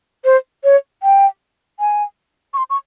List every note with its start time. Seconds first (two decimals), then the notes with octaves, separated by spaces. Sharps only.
0.25 C5
0.64 C#5
1.03 G5
1.80 G#5
2.54 C#6
2.58 C6
2.70 C#6